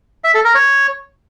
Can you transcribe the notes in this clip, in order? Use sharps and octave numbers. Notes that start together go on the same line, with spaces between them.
E5
A4
A#4
C#5